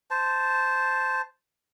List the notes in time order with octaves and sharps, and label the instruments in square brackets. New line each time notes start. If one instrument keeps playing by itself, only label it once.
[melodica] C5 A5